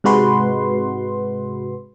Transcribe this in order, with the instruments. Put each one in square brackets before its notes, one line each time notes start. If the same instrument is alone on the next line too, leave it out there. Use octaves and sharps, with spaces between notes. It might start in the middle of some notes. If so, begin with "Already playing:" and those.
[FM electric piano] G#2 C3 G#3 F#4 B4 C6